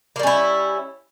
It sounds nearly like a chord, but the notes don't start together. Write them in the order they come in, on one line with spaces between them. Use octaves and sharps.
A#3 G3 C#4 E4